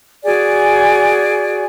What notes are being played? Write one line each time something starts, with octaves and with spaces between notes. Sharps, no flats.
F#4 G#4 D5 G#5